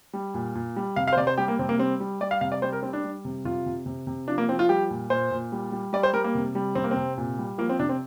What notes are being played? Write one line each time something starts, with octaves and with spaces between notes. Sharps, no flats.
G3
A#2
A#2
G3
C3 F5
F5
C5
C3 D5
C5
G3 G4
A#3
C3 C4
A#3
G3 C4
G3
G3 D5
F5
C3 F5
D5
G3 C5
A#4
G3 C4
D4
G3
C3
C3 F4
C3
C3
C3
F3 D4
A#3
F3 C4
F4
G3 G4
A#2
A#2 C5
A#2
G3
G3
G3 D5
C5
G3 A#4
A#3
C3
G3
C3 C4
A#3
C4
C3
A#2
G3
F3 A#3
C4
C3 D4
C4